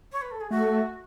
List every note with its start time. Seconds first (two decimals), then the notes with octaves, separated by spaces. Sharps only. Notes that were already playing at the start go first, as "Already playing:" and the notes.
0.12 C#5
0.22 B4
0.31 A4
0.41 G#4
0.50 A3 F#4